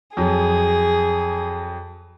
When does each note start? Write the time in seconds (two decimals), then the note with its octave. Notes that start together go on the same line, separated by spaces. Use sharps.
0.17 F2 F#3 G#4